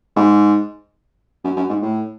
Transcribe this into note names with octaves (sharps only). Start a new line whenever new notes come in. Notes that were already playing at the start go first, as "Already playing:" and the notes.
G#2
F#2
F#2
G#2
A2